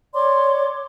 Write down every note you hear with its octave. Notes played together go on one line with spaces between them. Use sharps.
C#5 D5 C6 D6